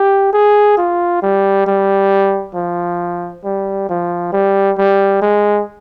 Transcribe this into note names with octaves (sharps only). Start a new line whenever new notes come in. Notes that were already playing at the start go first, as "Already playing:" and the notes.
Already playing: G4
G#4
F4
G3
G3
F3
G3
F3
G3
G3
G#3